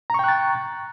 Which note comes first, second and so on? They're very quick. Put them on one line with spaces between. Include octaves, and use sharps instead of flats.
A#5 C#6 G5 F#6 A6